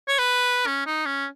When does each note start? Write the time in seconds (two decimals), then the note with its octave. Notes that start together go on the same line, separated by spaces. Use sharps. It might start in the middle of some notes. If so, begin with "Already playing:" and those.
0.08 C#5
0.18 B4
0.66 C#4
0.86 D#4
1.06 C#4